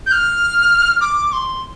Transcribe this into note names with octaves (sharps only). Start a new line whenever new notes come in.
G6
F6
D6
C6